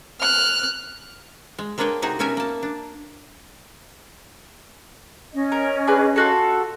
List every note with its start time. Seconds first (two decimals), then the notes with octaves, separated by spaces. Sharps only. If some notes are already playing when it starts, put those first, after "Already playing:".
0.19 F6 F#6
1.58 G#3
1.78 G#3 A#3 D4 B4 C#5 G5
2.02 C3 D#4 F#4 G#4
2.19 B2 B3 C#4 A#4 E5 G#5
2.37 A#3 A5
2.63 D4
5.34 C#4 D#5
5.52 A#4
5.87 D4 G#4 B4
6.16 F4 F#4 A4